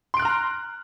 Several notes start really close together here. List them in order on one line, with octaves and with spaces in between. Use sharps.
C6 D7 F#6 F6 A#5